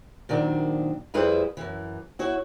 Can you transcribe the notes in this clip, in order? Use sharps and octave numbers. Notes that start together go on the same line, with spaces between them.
A#2 D#3 F#3 C4 D4
F2 G3 E4 G#4 B4 C5
F#2 E3
E4 F#4 C#5